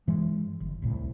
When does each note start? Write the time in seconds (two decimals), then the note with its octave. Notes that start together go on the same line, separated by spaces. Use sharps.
0.07 G2 E3 G#3
0.60 G1
0.82 D1 C2 A2